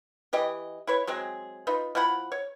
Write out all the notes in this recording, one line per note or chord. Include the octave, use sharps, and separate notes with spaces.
E3 G4 D#5
E4 B4 C#5
F#3 G#3 C4 G#4
D#4 F4 B4
F3 E4 F#5 B5
C#5